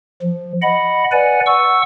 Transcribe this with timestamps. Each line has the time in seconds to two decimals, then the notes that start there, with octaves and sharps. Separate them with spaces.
0.22 F3
0.62 D#5 F#5 B5
1.12 B4 D5 F#5 G#5
1.46 F#5 C#6 E6